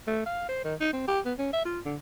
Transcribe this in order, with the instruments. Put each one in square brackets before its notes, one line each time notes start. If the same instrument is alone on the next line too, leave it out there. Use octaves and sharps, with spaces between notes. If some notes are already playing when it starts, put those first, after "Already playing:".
[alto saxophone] A3
F5
C5
D#3
D#4
C4
G4
B3
C#4
E5
F4
D3